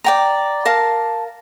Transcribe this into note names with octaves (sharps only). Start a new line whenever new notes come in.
D5 G5 A#5
A#4 F5 A5